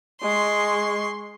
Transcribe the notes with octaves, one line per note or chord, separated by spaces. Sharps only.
G#3 C6 C#6